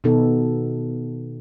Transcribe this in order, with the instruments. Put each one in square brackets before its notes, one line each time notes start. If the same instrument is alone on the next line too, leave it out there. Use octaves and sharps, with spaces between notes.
[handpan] B2 D#3 B3 D#4 A4